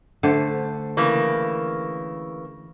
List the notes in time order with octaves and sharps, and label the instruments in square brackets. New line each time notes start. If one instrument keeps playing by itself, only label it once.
[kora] D3 A3 C5
[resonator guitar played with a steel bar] C#3 E3 A#3